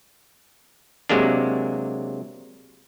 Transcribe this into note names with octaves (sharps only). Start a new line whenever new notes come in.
C3 F#3 G#3 A#3 D4